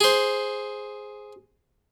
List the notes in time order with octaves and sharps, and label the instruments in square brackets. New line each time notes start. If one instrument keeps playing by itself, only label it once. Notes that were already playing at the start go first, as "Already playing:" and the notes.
[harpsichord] G#4 C5